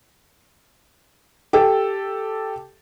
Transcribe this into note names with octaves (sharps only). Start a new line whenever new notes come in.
G4 A4